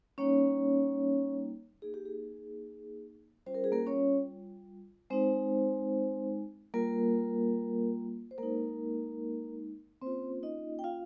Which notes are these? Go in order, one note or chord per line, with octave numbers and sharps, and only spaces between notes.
G3 A#3 C#4 D#4 C#5
A#3 D#4 G#4
G4
G#4
G3 C#4 F4 C5
A#4
G#4
A#3 A#4
C#4 C#5
G#3 C4 D#4 C5
G3 A#3 F4 A#4
C5
G#3 A#3 D#4 A#4
A#3 C4 C#4 F4 C5
D#4 D#5
G5
F4 F5